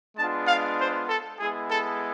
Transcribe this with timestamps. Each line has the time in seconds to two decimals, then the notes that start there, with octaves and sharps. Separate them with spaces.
0.17 G#3 B3 D4 F4 A5
0.48 F5
0.79 C5
1.09 A4
1.40 G#3 B3 E4 G#4
1.71 A4